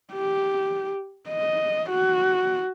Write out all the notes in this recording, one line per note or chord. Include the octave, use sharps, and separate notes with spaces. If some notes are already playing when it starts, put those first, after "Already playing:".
G4
D#5
F#4